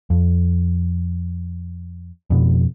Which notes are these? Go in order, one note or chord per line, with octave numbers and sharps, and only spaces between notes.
F2
F2 B2